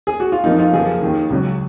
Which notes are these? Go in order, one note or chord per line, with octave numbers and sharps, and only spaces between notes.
G#4
F#4
F4
F2 F3 A#3 D#4
F4
F#2 C#3 F3 A#3 G#4
D#2 D#3 A#3
C#2 C#3 F#3